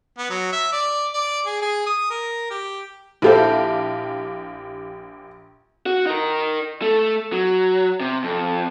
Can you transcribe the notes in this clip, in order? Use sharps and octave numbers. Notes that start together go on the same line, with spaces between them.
B3
F#3
E5
D5
D5
G#4
G#4
D#6
A#4
G4
A#1 E4 G4 A4 C5 F5
F#4
D#4 A#4
A3
F#3
C3
F2